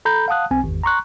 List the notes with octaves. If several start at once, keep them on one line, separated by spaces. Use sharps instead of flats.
A4 A#5 B5 G6
F5 F#5 A5 D#6 F#6
B1 C4 G#5
G#1 E2
A#5 C6 C#6 F#6